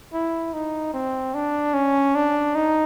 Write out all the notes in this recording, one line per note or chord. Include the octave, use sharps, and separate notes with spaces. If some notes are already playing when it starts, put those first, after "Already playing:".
E4
D#4
C4
D4
C#4
D4
D#4